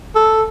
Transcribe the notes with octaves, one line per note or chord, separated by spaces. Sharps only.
A4